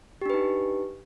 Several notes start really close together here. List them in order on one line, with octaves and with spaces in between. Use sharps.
G4 D4 B4 D#4